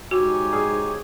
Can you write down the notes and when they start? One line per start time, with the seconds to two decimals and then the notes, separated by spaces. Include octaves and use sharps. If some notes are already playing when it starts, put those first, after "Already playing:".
0.11 G#2 F#4 G4 C#5 G#5
0.53 G#4